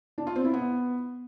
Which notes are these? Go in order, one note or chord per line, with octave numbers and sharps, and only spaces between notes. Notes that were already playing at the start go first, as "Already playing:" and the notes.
D4
F4
C4
E4
B3